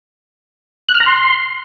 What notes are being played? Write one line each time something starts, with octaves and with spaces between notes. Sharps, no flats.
F#6
F6
A#5
C6